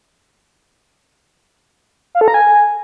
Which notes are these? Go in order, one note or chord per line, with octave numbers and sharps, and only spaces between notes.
F5
A4
A#5
G#5